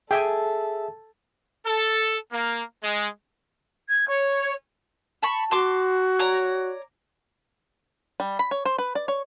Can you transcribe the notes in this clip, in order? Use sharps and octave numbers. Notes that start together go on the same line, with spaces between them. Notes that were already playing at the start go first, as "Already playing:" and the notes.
G#4 A4 E5 G5 G#5
A4
A#3
G#3
G#6
C#5
A5 B5 C#6
F#4 A5 C6 D6
C#5 D5 A#5
G3
B5
C#5
C5
B4
D5
C#5